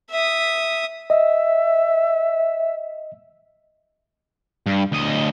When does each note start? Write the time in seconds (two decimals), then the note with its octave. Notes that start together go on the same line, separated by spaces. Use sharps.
0.11 E5 D#6
1.10 D#5 E5
4.67 G2
4.92 D2 D#5